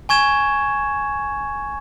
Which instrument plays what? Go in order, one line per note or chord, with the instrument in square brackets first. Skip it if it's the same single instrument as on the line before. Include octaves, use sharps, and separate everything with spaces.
[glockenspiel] G#5 C#6 G#6 E7